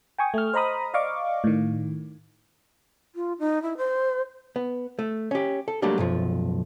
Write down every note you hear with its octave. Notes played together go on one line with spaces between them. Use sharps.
G5 G#5 C#6 D#6
A3 F6
C5 D#5 A#5 B5 D#6
D5 D#5 F5 C#6 D6
A2 D#3
F4
D#4
E4
C5
B3
A3
C#4 G4
A4
F#3 G3 A3 A#3 D4 G4
B1 F#2 F3